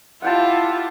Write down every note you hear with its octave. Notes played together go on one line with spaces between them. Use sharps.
E4 F4 G4 F#5 G5 A5